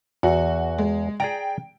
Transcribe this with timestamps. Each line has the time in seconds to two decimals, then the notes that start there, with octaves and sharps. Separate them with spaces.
0.23 E2 F#4 F#5
0.78 G#3
1.20 G#4 D5 G5 A#5 D7